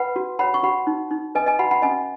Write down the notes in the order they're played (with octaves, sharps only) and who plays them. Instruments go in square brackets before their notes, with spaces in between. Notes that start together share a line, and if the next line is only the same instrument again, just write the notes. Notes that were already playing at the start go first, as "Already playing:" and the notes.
Already playing: [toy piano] B4 F#5 B5
F#4
C#5 F#5 B5
C#6
F#4 F#5 B5
D#4
D#4
B4 D#5 G#5
D#5 G#5
F#4 F#5 B5
F#5 B5
C#4 D#5 G#5